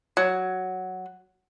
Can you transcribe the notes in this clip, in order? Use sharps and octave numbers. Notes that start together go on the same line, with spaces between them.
F#3